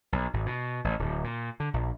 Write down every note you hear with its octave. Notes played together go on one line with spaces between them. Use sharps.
B1
G#1
B2
A1
D1
A#2
D3
A#1